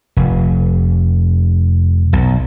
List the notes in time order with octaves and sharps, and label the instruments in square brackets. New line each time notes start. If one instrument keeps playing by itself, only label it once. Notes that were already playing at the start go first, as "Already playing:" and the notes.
[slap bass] F1
B1